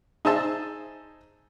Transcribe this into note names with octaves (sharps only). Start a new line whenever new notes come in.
D#4 G#4 C5 E5 A5